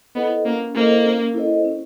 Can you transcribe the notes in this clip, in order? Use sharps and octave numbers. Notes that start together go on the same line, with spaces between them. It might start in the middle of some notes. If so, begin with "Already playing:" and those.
B3 E4 A4 C5 D#5
A#3 C#4
A#3 E4 A4 C5 D#5
C#4
E4 A4 C5 D#5
C#4